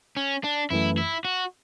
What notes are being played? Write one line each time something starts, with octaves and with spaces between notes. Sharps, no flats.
C#4
D4
F#2 E3 A3 E4
E4
F#4